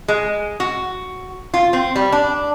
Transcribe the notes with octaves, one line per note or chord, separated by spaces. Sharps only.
G#3
F#4
F4
C4
G3
D4